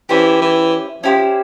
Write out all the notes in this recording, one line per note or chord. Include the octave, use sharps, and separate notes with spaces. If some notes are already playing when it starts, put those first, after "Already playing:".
E3 C#4 E4 G4 C5
E3
F3 C#4 E4 G4 C5